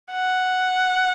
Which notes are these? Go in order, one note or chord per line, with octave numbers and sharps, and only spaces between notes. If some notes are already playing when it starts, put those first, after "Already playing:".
F#5